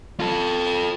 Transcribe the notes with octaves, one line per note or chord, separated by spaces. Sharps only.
F4 A4